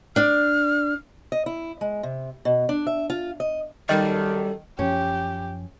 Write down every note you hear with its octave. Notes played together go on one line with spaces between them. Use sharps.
D4 D5 F6
D#5
E4
G#3
C3
B2
D4
E5
F4
D#5
F#2 D#3 G3 G4 A4 D#5
F#2 F3 C#4 G4